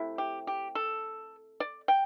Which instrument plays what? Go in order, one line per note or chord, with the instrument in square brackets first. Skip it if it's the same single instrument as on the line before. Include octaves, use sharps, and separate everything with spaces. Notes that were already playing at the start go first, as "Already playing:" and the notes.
Already playing: [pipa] C3 A3 E4
G4
G4
A4
D5
G5